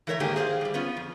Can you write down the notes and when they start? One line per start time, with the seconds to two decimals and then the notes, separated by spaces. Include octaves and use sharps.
0.07 E3 A3 A#4 C#5 E5
0.20 G#2 D#3 A3 A#3 G4 G#4
0.36 G#4 C5 D5 F5
0.61 A2 G3
0.74 B3 C#4 F4
0.97 F2